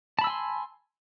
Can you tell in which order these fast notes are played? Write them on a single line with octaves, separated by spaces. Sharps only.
A5 B5 E6 G#5 C6